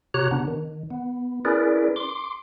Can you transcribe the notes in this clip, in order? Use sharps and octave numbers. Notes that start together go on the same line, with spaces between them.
C3 F#4 G4 C#5 A#5 F#6
C#3 B3 D4
D#3
B3
C#4 E4 G#4 A#4 B4 D5
C6 D6